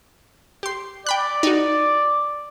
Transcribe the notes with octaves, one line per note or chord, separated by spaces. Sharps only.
G4 C6
D5 G5 B5 F#6
D#4 F#4